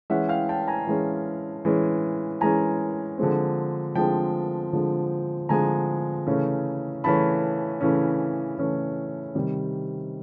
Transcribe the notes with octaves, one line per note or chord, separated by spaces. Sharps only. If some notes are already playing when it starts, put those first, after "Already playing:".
E3 G#3 C#4 E5 F#5
F5 G5
G5 A5
G#5 A#5
E3 G#3 C#4
E3 G#3 C#4
E3 G#3 C#4 G#5 A#5
D3 F3 G#3 C4
D3 F3 G#3 C4 G5 A5
D3 F3 G#3 C4
D3 F3 G#3 C4 G#5 A#5
C#3 E3 A3 C#4
C#3 E3 A3 C#4 A5 B5
C#3 E3 A3 C#4
C#3 E3 A3 C#4
C3 D#3 G3